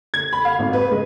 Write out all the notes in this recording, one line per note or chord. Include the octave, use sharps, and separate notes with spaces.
G#6
B5
F5
G#1
B4
G#3